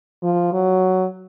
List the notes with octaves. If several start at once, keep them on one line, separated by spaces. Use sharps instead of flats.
F3
F#3